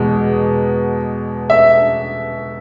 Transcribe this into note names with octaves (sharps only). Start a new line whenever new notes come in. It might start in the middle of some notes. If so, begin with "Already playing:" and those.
Already playing: E2 B2 G#3
E5